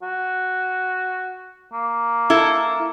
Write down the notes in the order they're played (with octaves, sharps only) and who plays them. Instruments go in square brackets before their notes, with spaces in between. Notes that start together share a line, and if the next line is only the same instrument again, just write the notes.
[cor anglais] F#4
A#3
[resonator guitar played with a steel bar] E4 A4